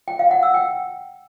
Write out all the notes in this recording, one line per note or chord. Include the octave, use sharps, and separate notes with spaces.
G5
F5
F#5
E6
G5